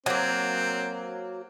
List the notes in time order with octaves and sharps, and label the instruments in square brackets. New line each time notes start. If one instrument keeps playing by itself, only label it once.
[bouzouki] F#3 A#3 [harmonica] C4